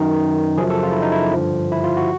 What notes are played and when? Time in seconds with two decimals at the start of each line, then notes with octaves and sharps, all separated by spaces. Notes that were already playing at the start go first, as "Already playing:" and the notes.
Already playing: F#2 D#3 D#4
0.57 F#2 C#3 F3 G#4
0.70 A4
0.83 F4
0.92 E4
1.02 D#4
1.12 E4
1.33 G2 D3 F3
1.72 E4
1.84 F4
1.97 F#4